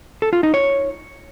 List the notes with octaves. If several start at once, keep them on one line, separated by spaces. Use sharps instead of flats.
A4
F4
D#4
C#5